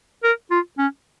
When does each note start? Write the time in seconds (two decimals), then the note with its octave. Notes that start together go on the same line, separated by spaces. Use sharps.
0.24 A#4
0.51 F4
0.78 C#4